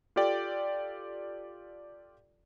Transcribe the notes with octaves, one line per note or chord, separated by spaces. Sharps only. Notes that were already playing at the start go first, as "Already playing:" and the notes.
F4 G4 A4 D5 G5